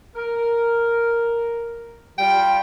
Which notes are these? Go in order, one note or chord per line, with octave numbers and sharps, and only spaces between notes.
A#4
G3 F4 G5